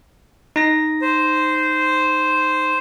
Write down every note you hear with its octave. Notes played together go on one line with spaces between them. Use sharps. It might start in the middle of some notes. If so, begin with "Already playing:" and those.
D#4 A#6
C5